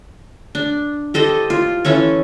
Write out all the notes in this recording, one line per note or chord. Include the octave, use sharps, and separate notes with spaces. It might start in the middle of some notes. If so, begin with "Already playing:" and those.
D4
G4 A4 C5 D#5
F4
E3 C#4 A4 C#5